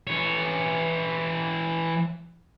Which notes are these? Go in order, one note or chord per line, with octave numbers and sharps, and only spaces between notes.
E3 C#5